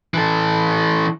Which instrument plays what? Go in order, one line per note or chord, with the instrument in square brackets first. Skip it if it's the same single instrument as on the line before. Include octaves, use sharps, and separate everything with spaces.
[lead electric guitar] E3 A4